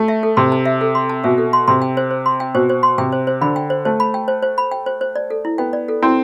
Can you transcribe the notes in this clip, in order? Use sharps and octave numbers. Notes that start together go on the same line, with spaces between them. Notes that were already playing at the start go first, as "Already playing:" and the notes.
Already playing: A3
E5
A4
C3 C6
A5
E5
A4
C6
A5
B2 E5
A4
C6
C3 C6
G5
C5
C5
C6
G5
B2 C5
C5
C6
C3 G5
C5
C5
D3 B5
G5
C5
A3 C5
B5
G5
C5
C5
B5
G5
C5
C5
D5
A4
E4
B3 G5
D5
A4
C4 E4